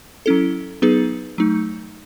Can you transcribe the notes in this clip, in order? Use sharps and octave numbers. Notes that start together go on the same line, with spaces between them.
F#3 C#4 E4 A4
F#3 B3 D#4 G#4 B4
F#3 A3 D#4